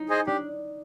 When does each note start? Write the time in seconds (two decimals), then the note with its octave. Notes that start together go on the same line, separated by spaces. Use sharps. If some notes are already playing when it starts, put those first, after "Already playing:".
Already playing: D#4
0.09 G#4 C5 D#5 G#5
0.27 D4 G4